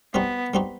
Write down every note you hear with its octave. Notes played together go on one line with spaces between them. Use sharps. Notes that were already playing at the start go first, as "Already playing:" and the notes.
G3 B3 C4 D#4 F#4
G3 C4 D#4 F#4